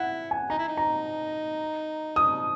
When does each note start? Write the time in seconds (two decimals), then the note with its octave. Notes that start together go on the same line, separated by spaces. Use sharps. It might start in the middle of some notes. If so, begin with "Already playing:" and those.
Already playing: E4 F#5
0.31 G#5
0.50 D#4 A#5
0.59 E4
0.68 D#4
0.77 A#5
2.16 D#6